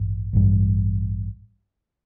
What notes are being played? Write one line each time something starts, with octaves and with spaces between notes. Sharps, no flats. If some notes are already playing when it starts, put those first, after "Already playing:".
Already playing: A1 G2
A1 G2